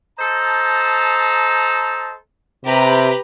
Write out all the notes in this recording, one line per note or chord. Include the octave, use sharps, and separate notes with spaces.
A4 C5 D#5 A5 A#5
C3 G4 B4 A#5